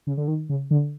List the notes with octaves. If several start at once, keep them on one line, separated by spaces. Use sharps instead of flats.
C#3
D3
D#3
C#3
D3